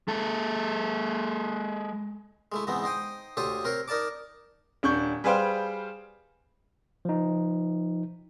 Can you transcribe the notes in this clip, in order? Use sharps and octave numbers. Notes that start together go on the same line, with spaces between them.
G#3 A4
G#3 A3 E4
G#2 E3 B3 C4 D#4
D#4 C5 G5 D#6
D2 G4 A4 C5 C#5 D#6
C4 A#4 C5 C#5
D#4 A#4 D5 A5 D6
D#1 D4 C#6 G6
G3 G#4 B4 C5 F5 G5
F3 D#4